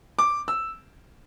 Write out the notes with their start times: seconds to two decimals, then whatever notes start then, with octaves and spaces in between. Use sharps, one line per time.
0.19 D6
0.48 E6